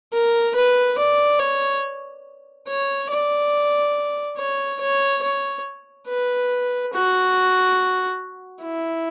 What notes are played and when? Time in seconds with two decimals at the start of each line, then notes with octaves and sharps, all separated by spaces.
0.13 A#4
0.55 B4
0.98 D5
1.40 C#5
2.68 C#5
3.10 D5
4.37 C#5
4.81 C#5
5.22 C#5
6.08 B4
6.93 F#4
8.62 E4